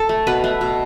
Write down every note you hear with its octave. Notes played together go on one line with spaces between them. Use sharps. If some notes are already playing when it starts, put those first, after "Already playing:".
Already playing: A4
A3
B2 B4
A3
B2